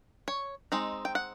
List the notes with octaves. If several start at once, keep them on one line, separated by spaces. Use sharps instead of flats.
C#5
G#3 C4 D#4
G5
F#5